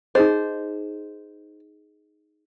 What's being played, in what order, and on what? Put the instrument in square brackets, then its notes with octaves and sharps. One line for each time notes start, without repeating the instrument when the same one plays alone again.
[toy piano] D#4 G#4 D#5 [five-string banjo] C5